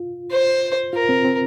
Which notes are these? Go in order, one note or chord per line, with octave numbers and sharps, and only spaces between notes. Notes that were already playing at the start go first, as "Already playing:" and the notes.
Already playing: F4
C5
F4 A#4
C4
C4